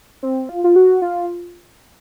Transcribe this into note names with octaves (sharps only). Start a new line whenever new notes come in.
C4
F4
F4
F#4
F4